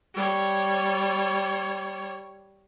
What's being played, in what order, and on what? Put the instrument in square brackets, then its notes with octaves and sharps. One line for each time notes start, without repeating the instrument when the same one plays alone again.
[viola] G3 C#5